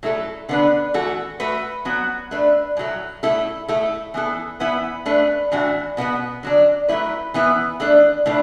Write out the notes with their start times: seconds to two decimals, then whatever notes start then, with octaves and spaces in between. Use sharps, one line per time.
0.03 F#3 A3 E4 A4
0.49 D3 B3 D4 B4
0.94 E3 A3 F#4 A4
1.40 A3 F#4 B4
1.85 F#3 B3 F#4
2.31 A3 D4 B4
2.77 A2 F#3 A3
3.23 A3 E4 A4
3.68 A3 E4 A4
4.14 E3 B3 E4 A4
4.60 E3 B3 E4 B4
5.06 A3 D4 B4
5.52 A2 E3 D4 F#4
5.97 B2 B3 E4 B4
6.43 D3 F#3 D4
6.88 F#3 A3 E4 B4
7.34 E3 B3 E4 B4
7.80 E3 A3 D4
8.26 A2 E3 A3 D4